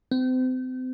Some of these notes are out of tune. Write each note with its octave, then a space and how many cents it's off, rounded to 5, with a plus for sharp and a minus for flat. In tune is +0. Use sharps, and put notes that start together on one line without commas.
C4 -35